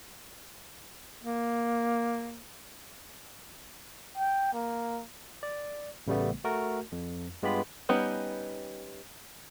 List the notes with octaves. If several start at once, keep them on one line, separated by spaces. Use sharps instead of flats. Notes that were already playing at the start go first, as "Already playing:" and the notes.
A#3
G5
A#3
D5
A1 C#3 G3 A3 B3
A3 F#4 A#4
F2
G2 G#3 B3 F4 G4 B5
G3 B3 C#4 D#4 G4